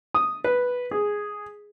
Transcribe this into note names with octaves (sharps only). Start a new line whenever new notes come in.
D#6
B4
G#4